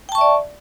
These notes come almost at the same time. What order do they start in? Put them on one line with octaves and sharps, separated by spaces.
G5 A5 C#6 E5 D5